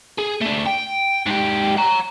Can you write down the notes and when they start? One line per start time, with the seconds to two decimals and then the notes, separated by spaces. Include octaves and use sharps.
0.18 G#4
0.41 A3 D4
0.66 G5
1.26 G#2 G4
1.77 F#5 A#5